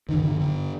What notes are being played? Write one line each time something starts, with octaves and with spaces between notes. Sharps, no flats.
G2 D3 D#3
D3
G2 D3